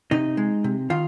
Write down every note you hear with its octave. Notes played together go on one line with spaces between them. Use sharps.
C3 D#4 D#5
G#3
C3
D#3 F4 F5